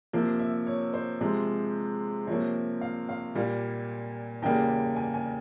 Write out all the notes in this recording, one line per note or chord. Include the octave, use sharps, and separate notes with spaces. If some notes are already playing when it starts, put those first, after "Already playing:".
C3 F3 A#3
E5
C#5
C5
C3 F3 G#3
C3 F3 A#3 C#5
F5
F5
A#2 G3 A#3
E2 C#3 G3 A#3 G5
G#5
G#5